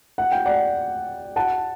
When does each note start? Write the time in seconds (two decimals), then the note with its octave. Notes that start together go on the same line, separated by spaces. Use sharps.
0.18 F#5
0.32 G5
0.46 D5 F#5
1.36 F#5 A5